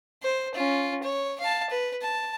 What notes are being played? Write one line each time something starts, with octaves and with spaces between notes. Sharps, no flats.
C5
C#4 F4
C#5
F5 A5
B4
A5